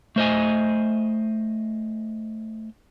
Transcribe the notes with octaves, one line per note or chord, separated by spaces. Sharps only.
A3 C5 D#5 G#5